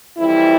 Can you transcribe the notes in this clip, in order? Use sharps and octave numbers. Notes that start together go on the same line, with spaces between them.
F2 E3 G3 C4 E4